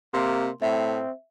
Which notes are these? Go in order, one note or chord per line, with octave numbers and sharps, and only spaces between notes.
C3 A#3 C6
A2 C4 E5